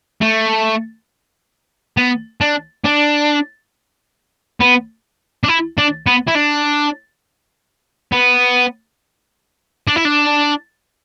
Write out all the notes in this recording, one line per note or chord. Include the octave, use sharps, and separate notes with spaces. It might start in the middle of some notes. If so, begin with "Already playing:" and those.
A3
B3
D4
D4
B3
D4
E4
D4
B3
E4
D4
B3
D4
E4
D4